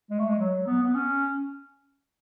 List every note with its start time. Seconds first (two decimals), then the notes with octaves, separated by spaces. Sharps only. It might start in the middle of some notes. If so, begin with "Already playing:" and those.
0.10 G#3
0.19 A3
0.28 G#3
0.39 F#3
0.66 B3
0.82 B3
0.95 C#4